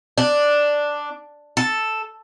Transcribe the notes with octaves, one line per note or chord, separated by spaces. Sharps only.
D4
A4